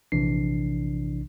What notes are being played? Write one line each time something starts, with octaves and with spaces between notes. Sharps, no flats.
A#1 C3 E3 D4 C7